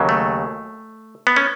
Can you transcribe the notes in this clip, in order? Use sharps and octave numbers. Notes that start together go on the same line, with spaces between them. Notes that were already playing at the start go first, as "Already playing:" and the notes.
Already playing: D#2 C#3 F#3
A3
B3
C#4